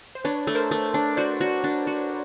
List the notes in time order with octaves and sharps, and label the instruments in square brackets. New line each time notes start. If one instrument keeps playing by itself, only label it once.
[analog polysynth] C5
[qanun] D4 [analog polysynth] B4 C#5
[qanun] A3
[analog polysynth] A#4 C5
[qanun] A3
D4
[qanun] F#4 [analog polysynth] C5 D5
[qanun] F#4
D4
F#4